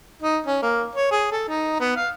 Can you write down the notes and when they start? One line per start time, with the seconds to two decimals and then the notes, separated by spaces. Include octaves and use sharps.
0.22 D#4
0.47 C#4
0.63 A#3
0.95 C#5
1.12 G#4
1.32 A4
1.49 D#4
1.80 B3
1.96 F5